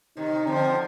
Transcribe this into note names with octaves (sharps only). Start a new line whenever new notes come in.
C3 D#3 D#4
D3 F3 C4